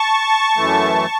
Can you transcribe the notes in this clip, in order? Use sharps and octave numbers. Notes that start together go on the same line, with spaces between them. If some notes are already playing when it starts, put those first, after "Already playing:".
Already playing: A5 C#6
F#2 E3 A3